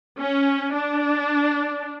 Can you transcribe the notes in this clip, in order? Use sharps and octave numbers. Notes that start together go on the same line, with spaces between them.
C#4
D4